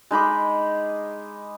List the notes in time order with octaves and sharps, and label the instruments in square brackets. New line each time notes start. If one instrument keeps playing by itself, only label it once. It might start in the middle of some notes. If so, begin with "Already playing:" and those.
[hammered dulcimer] G#3 D#4 B5 D6